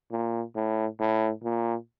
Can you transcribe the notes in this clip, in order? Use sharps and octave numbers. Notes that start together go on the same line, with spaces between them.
A#2
A2
A2
A#2